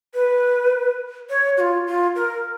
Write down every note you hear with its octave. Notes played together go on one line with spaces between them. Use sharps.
B4
C#5
F#4
F4
F4
A#4